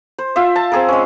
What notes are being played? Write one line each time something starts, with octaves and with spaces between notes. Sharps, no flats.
C5
F4 C5 E5
A5
C4 G#4 A#4
G#3 C#4